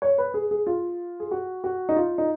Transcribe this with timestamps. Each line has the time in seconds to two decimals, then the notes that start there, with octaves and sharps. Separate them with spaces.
0.02 C#5
0.18 B4
0.34 G#4
0.51 G#4
0.67 F4
1.20 G#4
1.31 F#4
1.64 F#4
1.89 D#4
1.96 F4
2.18 D#4